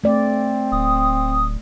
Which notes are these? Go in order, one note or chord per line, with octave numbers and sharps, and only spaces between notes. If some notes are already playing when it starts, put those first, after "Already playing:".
A3 C4 D5
D1 D#6